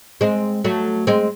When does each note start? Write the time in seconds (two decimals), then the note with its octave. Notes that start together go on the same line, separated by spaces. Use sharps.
0.21 G#3 C4
0.64 F#3 A3
1.07 G#3 C4